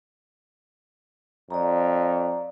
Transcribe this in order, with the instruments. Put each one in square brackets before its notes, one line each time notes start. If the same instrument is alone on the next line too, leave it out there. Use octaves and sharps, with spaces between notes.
[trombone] F2 [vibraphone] D5 A#5